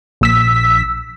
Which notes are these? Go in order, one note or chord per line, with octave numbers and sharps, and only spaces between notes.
A#1 E6 B6